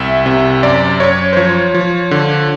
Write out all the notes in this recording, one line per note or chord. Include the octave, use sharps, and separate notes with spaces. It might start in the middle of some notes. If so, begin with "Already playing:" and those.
Already playing: C2 E5
C3
F#2 D5
F#2 C#5
C5
F3 C#5
F3
D3